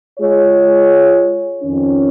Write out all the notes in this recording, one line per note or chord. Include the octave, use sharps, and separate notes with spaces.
G#3 F4 G#4 C#5
F2 D#3 C#4